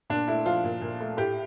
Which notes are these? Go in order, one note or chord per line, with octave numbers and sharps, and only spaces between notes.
A#2 D4
A3 E4
F3 F4
A#2
A#2
A3
A2 G4